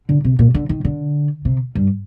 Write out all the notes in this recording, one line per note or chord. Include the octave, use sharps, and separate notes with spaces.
D3
C3
A#2
D3
D#3
D3
C3
G2